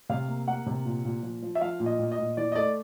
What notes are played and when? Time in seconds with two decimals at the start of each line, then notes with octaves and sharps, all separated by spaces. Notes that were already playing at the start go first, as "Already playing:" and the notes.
0.09 C3 F5
0.28 A#3
0.47 A#3 F#5
0.66 C3
0.85 A#2
1.04 A#2
1.23 F3
1.42 F3
1.55 E5
1.61 F3 F5
1.80 A#2
1.86 D#5
1.99 A#2
2.12 D#5
2.19 A#2
2.37 E3 D5
2.52 D#5
2.55 A3 D5